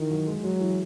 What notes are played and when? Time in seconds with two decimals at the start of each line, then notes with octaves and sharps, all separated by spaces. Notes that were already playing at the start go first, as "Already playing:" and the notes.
Already playing: D#3 E3
0.10 F#3
0.27 G#3
0.44 F#3 G#3
0.60 E3